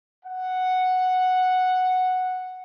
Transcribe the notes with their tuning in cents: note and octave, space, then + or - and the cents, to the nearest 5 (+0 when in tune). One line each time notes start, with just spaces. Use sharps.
F#5 -5